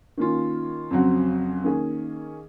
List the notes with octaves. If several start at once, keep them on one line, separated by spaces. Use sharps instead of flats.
D#3 A#3 C#4 F4
F2 C#3 F#3 C4 F#4
D#3 A#3 C#4 G#4